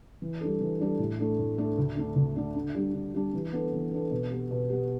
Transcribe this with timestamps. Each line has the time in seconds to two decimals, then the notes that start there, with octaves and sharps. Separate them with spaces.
0.22 E3
0.41 G3 D4 A4
0.61 E3
0.80 G3 D4 A4
0.99 A2
1.19 A3 D4 A4
1.39 A2
1.58 A3 D4 A4
1.78 D2
1.96 D3 A3 D4
2.16 D2
2.36 D3 A3 D4
2.56 D3
2.75 G3 D4
2.95 D3
3.15 G3 D4
3.34 E3
3.53 B3 D4 A4
3.73 E3
3.91 B3 D4 A4
4.11 B2
4.31 B3 G4
4.51 B2
4.70 B3 G4